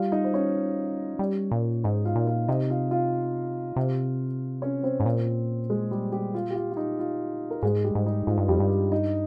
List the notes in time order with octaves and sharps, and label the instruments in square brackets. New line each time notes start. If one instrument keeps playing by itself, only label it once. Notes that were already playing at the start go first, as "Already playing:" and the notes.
Already playing: [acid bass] G3 [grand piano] F4 F5
[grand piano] D#4 D#5
C5
C#4 C#5
[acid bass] G3
A#2
[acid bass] G#2 [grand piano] D#4 D#5
[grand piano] F4 F5
[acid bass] A#2
[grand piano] F4 F5
[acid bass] C3 [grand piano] D#4 D#5
[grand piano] F4 F5
F4 F5
[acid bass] C3
[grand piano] C#4 C#5
C4 C5
[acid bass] G#2
A#2
[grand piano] G#3 G#4
G3 G4
G3 G4
F4
G4
F4
F4
D#4
F4
A#4
[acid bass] G#2 [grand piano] G#3 G#4
[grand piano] G3 G4
[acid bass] G#2
[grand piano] D#4
[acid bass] G#2 [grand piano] F4
[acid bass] G2
[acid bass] F2 [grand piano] G3 G4
[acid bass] G2
[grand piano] D#4 D#5